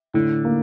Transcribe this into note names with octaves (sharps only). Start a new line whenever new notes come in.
A2 D3
A#3